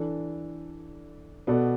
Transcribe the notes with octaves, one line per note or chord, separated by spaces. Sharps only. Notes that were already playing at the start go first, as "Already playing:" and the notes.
Already playing: E3 D4 A4
B2 B3 F#4 A4 D5